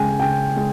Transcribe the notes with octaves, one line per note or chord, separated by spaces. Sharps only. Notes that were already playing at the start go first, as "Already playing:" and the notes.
Already playing: C#3 G#3 G5 G#5
C#3 G5
G#3